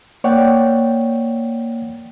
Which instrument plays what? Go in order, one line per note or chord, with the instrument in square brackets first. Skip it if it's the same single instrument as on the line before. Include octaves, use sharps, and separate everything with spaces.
[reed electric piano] A#3 C#5 D5 F#5 G5